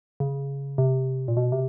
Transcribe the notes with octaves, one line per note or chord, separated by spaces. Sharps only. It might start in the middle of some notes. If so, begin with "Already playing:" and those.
C#3
C3
A#2
B2
C3